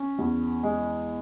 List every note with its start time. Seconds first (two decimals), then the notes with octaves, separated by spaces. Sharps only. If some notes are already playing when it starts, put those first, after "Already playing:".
Already playing: C#4
0.19 E2
0.63 G#3